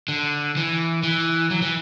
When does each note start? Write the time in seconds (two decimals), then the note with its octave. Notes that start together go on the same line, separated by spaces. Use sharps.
0.08 D3
0.57 E3
1.03 E3
1.50 F#3
1.62 E3